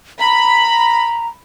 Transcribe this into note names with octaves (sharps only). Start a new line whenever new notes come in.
A#5 B5